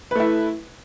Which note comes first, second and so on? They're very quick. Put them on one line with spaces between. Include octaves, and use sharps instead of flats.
B4 A3 E4